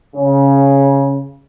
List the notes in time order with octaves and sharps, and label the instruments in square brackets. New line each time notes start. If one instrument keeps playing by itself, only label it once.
[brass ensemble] C#3